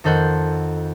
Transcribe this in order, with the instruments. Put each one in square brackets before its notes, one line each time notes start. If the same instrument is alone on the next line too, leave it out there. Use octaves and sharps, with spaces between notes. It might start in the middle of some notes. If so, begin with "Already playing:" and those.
[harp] F2 D#3 A4 C5 F#5 G6